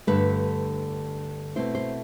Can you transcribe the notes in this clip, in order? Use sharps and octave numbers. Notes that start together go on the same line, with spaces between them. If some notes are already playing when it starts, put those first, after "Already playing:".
G2 D3 A3 B4
B2 A3 C4 E4 C5
C5